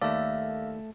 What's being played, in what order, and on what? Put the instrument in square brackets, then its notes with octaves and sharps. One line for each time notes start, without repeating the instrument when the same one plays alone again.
[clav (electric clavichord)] D#2 A4 D5 [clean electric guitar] A3 [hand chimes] E5 F5